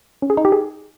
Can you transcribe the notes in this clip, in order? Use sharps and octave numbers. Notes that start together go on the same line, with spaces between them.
C#4
G#4
D#4
G4
G#4